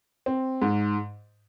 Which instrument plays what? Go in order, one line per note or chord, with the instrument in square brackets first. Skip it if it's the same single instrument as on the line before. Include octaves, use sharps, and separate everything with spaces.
[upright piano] C4
G#2